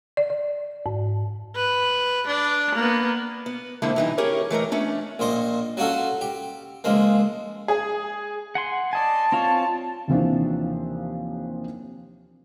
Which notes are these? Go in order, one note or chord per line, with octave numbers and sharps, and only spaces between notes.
D5
D5
G#2
B4
D4
A#3 B3
B3
F2 D3 G#3 A#3 C4 E4
G2 E3 D#4
C#4 G4 G#4 A#4 C#5
E3 A3 A#4 D#5
A3 C#4 D4
A#1 A#2 C5 D#5
F#3 C#4 F4 F#4 A4
G4
C#2 F3 G#3 A#3
G#4
F#5 G#5 C6
D5 D#5 G#5 A5
C4 F4 C#5
D#2 C3 E3 F3 C4 D4